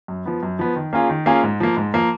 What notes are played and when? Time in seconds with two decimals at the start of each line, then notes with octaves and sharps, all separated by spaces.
0.08 F#2
0.26 F3 B3
0.43 F#2
0.59 F3 B3
0.76 D#3
0.93 A#3 C#4 F4 G#4
1.09 D#3
1.26 A#3 C#4 F4 G#4
1.43 G#2
1.60 F3 A#3
1.77 G#2
1.94 F3 A#3